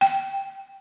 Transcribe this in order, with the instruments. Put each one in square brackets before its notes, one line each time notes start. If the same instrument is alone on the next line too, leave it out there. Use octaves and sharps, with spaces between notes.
[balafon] G5